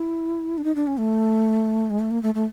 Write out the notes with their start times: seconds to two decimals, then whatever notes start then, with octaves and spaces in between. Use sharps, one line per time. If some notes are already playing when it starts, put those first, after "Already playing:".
Already playing: E4
0.58 D4
0.64 D#4
0.75 D4
0.87 C#4
0.98 A3
1.90 G#3
1.99 A3
2.11 A#3
2.23 A3
2.35 A3